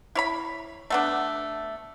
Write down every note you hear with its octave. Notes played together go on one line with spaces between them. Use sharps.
E4 C#5 B5
A3 B3 D4